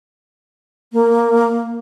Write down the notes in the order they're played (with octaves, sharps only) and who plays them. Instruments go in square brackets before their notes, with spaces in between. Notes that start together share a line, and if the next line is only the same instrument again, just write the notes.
[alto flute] A#3